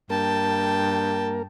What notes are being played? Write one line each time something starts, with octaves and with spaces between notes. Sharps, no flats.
G2 A#3 A#4 G5 A5